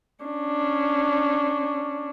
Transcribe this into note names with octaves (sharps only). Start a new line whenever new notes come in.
C#4 D4